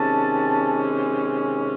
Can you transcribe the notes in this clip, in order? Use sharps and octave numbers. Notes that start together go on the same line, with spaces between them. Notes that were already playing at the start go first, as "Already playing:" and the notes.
Already playing: C3 D#3 G#3 C#4 A5